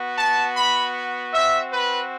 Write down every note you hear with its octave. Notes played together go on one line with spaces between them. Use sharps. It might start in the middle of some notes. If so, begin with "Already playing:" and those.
Already playing: B3 F#4
A5
B5
C4 F#4 E5
B4